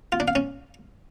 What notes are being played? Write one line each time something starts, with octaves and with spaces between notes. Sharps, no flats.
F4
D4
F5
C#4